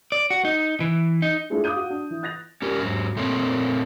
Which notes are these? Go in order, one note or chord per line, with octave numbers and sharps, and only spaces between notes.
D5
F#4
D#4
E3
D#4
G#3 A3 D4 E4 F4 G#4
F5 D6 D#6 F#6 G6 D#7
F#4
D4
E3
F#6 A6 A#6 F7
C#4 G4 A#4
G#2 F#3
A#2 A3 A#3 C4 C5 C#5